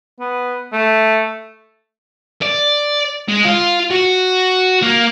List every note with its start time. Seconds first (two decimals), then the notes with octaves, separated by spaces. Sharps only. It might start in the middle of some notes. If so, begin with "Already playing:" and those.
0.20 B3
0.73 A3
2.42 D5
3.29 G#3
3.45 F4
3.91 F#4
4.83 A#3